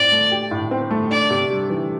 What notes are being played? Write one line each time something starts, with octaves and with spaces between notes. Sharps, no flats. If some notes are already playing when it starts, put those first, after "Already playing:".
Already playing: A2 C4 D5
A3
G4
A2
C4
A3
D4 D5
C3
G3
E3